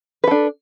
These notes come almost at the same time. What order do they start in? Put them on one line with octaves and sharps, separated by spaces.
B4 A4 D4